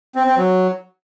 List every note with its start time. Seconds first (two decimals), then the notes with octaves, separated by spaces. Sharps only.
0.15 C4
0.26 C4
0.37 F#3